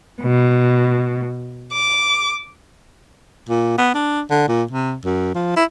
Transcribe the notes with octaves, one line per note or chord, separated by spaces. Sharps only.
B2
D6
A#2
B3
D4
D3
A#2
C3
F#2
F3
E4